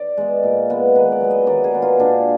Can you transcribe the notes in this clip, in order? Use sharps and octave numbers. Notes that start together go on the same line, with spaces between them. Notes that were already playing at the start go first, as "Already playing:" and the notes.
Already playing: D5
G#3 B3
A#2
G#3 B3
D#3 B4
D5
F#3 B3
D#5
D#3 D5
G#4
F#3 B3
F4
A#2 D4